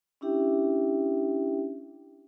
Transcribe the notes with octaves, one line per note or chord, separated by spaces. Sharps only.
C#4 D4 E4 G4 E5 G5